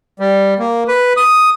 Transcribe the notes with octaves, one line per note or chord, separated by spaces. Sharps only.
G3
A#3
B4
D#6